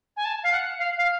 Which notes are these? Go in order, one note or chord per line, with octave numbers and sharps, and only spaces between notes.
G#5
A5
F5
F#5
F5
F5